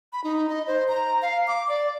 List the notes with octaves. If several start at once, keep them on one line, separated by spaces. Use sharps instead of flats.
B5
D#4
D#5
C5
A#5
F5
D6
D5